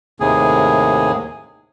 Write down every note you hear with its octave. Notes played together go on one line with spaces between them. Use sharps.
D#2 A2 C3 G#4